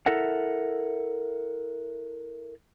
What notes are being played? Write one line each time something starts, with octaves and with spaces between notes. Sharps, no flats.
E4 A4 A#4 E5 F#5